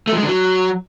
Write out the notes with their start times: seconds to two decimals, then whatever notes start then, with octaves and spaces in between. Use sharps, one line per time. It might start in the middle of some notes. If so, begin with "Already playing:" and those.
0.07 A3
0.12 F3
0.17 G#3
0.23 D3
0.28 F#3